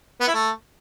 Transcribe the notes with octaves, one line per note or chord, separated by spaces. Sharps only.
B3
E4
A3